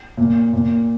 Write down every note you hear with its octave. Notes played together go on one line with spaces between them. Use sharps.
A#2
A#2